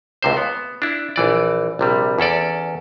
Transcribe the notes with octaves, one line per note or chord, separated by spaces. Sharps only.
C#2 C3 C5
B3
D4 E4
A#1 E3 D5
A#1 C3 G3
E2 C#4 A4 D5